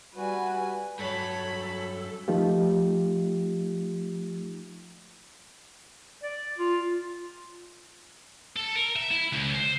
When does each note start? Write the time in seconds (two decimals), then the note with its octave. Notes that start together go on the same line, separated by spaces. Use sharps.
0.16 G3 F#4 B4 G#5
0.99 G2 F#3 A4 C#5 B5
2.28 F3 A3 D#4 F4 G4
6.23 D5
6.58 F4
8.57 A4
8.76 A#4
8.96 E5
9.11 E4
9.32 C#2
9.55 C5